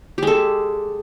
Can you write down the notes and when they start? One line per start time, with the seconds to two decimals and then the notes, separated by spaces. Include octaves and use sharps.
0.18 G4
0.23 G#3
0.27 A4